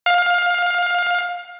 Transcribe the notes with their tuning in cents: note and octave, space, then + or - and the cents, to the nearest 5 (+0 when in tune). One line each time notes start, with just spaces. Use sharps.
F5 +20